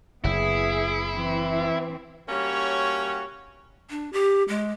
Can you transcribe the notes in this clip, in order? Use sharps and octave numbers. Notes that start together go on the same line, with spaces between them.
F#1 B3 E4 G#4
E3 C4
G3 A#3 C#4 F#4 C#5
D4
G4
G#3